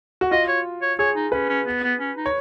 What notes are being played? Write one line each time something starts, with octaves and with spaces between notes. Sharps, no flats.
F#4
F4 D#5
C#5
C#5
G#4 C#5
D#4
C#4 B4
C#4
B3
B3
C#4
D#4
C#5